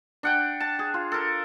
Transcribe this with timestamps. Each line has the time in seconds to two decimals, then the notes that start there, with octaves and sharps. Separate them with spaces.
0.23 D4 F#5 G5
0.60 A5
0.79 G#4
0.94 F4
1.12 A4 A#4